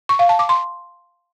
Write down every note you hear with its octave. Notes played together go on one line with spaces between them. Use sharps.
C#6
F5
A5
D6
C6